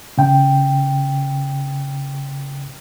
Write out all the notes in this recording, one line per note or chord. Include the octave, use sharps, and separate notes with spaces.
C#3 G5